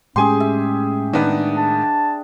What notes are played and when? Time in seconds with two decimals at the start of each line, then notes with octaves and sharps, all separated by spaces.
0.16 A2 G#3 C#4 G4 G#4 G#5 C6
0.40 E5
1.13 D#3 B3 D4
1.57 A5